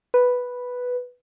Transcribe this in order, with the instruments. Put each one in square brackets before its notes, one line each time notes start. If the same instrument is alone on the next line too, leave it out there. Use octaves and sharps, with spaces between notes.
[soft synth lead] B4